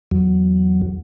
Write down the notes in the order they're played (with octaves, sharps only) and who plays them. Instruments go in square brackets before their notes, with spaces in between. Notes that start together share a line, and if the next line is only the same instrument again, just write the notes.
[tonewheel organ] E2 F#3